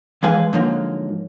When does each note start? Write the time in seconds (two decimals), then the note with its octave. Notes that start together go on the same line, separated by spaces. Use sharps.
0.23 E3 F3 G#3 B4 F5 G#5
0.53 G#2 D3 F3 F#3 A#3